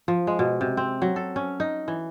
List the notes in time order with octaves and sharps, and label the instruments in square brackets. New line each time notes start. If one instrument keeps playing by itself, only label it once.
[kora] F3
G#3
B2
C3
C4
F#3
A4
C#4
D#4
E3